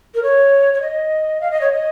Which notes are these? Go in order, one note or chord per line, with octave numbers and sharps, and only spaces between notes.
A#4
C#5
C#5
D#5
F5
D#5
C#5
D#5